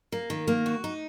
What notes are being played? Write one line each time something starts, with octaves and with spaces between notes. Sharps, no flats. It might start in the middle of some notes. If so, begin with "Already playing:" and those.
A#3
D#3
A#3
F#4
D#4